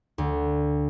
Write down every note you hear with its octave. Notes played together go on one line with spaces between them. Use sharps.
D2